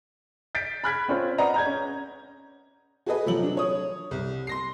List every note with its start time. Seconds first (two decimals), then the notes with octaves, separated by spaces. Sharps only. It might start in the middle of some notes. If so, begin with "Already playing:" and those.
0.55 G6 A6 B6 C7 D7
0.84 B5 F6 F#6 G#6 B6
1.08 C4 C#4 F4 C5
1.38 B4 D5 D#5 F#5 A#5
1.54 A#5 G6 G#6
1.66 C#4
3.06 F#4 G#4 A4 B4 D#5
3.26 C3 F3 F#3 A3 F#7
3.43 D4
3.57 C#5 D#6
4.11 C2
4.47 C6 A#6 C7